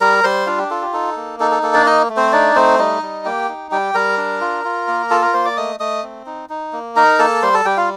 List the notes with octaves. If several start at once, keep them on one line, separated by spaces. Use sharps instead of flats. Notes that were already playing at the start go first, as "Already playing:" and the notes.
G3 A#4 A#5
G3 C5 C6
D4 F4 F5
G4
F4 A4
G4
D#4 A4
A#3
D#4 A4
A4
A#3 A4
D4 D5
D#4 D#5
A3
C4 C5
D4 D#4 D5
A3 C4 C5
G3 D#4 D#5
G3
A#3 G4 G5
D#4
G3 G4 G5
G3 A#4 A#5
D4
F4
F4
A#3
F4 A4 A5
A#4 A#5
A#3 C5 C6
D5 D6
A3 D#5 D#6
A3 D#5 D#6
C4
D#4
D#4
A#3
D#4 A#4 A#5
A#3 A4 A5
G3 C5 C6
A4 A5
G3 G4 G5
F4 F5